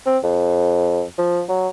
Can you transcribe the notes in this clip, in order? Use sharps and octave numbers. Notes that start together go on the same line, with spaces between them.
C4
F2
F3
F#3